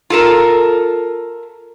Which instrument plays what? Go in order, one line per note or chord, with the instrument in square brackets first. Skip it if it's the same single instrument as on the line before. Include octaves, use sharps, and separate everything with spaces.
[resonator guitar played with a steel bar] F4 A4 A#4